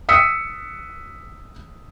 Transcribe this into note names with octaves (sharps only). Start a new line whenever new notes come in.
D#6 E6 B6 C#7